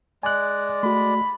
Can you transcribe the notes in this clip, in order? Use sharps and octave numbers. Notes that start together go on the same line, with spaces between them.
G#3 D5 G#5 F#6
A3 F#4 B5